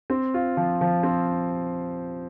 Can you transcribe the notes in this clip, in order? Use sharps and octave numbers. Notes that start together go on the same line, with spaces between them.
C4
F4
F3
F3
C4